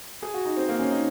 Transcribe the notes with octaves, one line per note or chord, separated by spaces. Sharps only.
G#4
F#4
D#4
C4
A#3
C#4
D#4